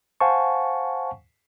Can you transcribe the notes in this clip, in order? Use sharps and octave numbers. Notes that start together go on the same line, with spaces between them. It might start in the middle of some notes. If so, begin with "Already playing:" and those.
C5 F5 F#5 G#5 A5 C#6